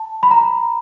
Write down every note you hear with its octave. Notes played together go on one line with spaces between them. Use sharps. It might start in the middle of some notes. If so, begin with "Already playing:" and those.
Already playing: A5
B5
A#5